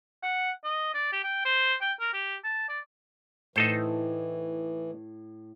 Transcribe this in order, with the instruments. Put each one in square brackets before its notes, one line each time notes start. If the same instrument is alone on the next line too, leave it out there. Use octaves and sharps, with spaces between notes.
[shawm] F#5
D#5
D5
G4
G5
C5
G5
A#4
G4
A5
D5
[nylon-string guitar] A2 [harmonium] E3 [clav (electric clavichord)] D#4 A4 C5